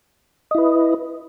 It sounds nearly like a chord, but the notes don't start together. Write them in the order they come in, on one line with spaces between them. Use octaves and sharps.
D#5 E4 B4